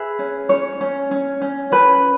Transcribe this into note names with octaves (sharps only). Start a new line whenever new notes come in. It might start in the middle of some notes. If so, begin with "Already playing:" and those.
Already playing: G#4 B4 E5
C#4
C#4 C#5
C#4
C#4
C#4
C#4 B4